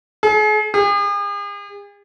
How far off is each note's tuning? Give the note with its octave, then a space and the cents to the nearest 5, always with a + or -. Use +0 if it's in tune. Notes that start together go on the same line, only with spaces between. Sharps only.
G#4 +40
G#4 -45